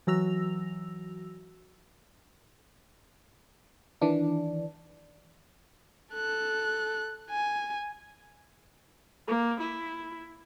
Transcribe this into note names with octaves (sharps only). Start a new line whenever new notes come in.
E3 F#3 F#4 E6 A#6 F7
D#3 E3 D4
A4 F#6
G#5
A#3
E4